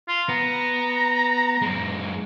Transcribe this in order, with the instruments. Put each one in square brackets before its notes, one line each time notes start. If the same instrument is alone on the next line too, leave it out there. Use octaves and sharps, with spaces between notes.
[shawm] F4
[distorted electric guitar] B3 [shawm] A#5
[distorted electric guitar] F#2 G#3